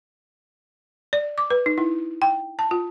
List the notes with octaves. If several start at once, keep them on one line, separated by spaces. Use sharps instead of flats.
D5
D6
B4
D#4
E4
G5
A5
F4